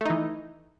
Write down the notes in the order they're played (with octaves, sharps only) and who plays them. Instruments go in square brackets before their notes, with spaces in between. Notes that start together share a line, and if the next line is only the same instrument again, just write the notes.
[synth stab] A3
D#4
E3